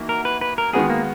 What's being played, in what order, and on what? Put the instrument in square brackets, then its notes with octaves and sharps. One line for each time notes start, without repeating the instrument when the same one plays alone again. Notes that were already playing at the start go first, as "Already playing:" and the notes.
Already playing: [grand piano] E3 A#3 D#4 F#4
[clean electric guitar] A#4
B4
B4
A#4
[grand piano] D#3 G#3 B3 F#4 [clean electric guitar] G#4
[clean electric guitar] A#3